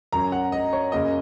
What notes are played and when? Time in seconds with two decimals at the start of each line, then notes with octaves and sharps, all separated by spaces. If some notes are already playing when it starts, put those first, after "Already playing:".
0.12 F#2 F#3 C#4 A#5
0.32 F#5
0.52 D#5
0.73 C#5
0.92 F#2 C#3 A#3 C#4 D#5